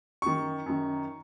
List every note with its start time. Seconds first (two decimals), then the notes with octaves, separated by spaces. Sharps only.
0.22 F#2 D#3 C#6
0.66 F#2 D#3